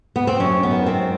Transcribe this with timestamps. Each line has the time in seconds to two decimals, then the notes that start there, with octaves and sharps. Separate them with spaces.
0.16 B3
0.27 C4
0.39 F#2 C#4
0.63 B3
0.71 D#3
0.86 C4
1.02 G#3